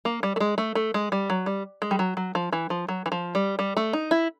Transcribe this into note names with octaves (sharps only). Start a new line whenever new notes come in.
A#3
G3
A3
G#3
A3
A3
G#3
G3
F#3
G3
G#3
G3
F#3
F#3
F3
E3
F3
F#3
E3
F3
G3
G3
A3
D#4
E4